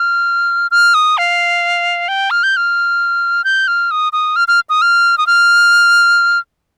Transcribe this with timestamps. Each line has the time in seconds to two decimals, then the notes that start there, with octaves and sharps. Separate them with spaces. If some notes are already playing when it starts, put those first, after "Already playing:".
Already playing: F6
0.71 F6
0.94 D#6
1.18 F5
2.08 G5
2.31 F6
2.43 G6
2.57 F6
3.44 G6
3.68 F6
3.91 D#6
4.13 D#6
4.36 F6
4.48 F6
4.70 D#6
4.82 F6
5.18 D#6
5.27 F6